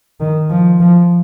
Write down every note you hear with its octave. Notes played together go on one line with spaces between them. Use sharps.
D#3
F3
F3